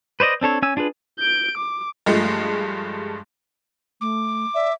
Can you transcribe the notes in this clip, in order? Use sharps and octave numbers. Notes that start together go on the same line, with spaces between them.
B4 C5 D5 D#5
C4 D4 A4 C#5
C#4 G#5 E6
D4 F4 G#4 B4
G6 D7
D6
G2 F3 G#3 A3
A3 D6
D5 E5